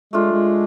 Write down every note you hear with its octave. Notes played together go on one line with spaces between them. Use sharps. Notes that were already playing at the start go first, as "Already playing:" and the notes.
G#3 A3 D4 F4
G#3